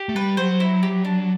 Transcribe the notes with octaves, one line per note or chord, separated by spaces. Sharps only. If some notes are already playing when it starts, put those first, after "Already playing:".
Already playing: G4
A3
G3 B4
F#3 C5
E4
G4
D4